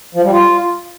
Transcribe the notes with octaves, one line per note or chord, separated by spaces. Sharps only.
F3
G3
F4